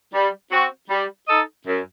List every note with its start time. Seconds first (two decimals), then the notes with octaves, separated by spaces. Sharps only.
0.14 G3
0.52 C4 F#4
0.90 G3
1.28 D#4 A4 D#5
1.67 F#2